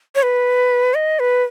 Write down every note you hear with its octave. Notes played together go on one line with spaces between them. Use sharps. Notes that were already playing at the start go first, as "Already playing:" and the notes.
C#5
B4
D#5
B4